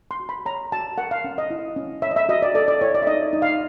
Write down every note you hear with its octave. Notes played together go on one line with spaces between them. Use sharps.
C6
F#4
B5
C#5 A#5
F#4 A5
A#4 F#5
F5
C#4
D#5
E4
C#4
C#5 E5
D#5
E5
F#4 D#5
D5
A4 D5
D5
E4 C#5
D5
E5
D#4 D#5
D#4
F5